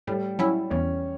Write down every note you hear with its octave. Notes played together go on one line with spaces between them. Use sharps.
A2 G3
F#3 C#4 E4
E2 C#4